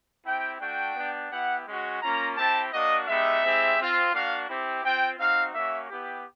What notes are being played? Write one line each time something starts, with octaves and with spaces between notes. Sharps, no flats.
C4 E4 G4 G5
A3 D4 F#4 G5
B3 D4 G4
B3 E4 G4 F#5
G#3 C#4 F#4
A#3 C#4 F4 A#5
C4 E4 G4 A5
A#3 D4 F#4 D#5
G#3 B3 D#4 G4 E5
G#3 C4 E4 G4
C4 F4
A#3 D4 F#4 F5
C4 E4 G4
C4 F4 G5
C4 D#4 F#4 F5
A#3 C#4 F#4 E5
B3 E4 G4